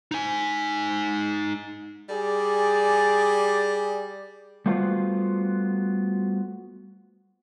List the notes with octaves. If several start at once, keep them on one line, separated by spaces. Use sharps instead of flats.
D#4 G#5
G3 G#4 D5
G3 A3 B3 F4 F#4 C5